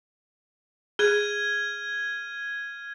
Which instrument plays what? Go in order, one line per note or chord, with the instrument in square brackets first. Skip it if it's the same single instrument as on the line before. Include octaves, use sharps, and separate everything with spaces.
[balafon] G#4 [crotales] F6 G#6 D#7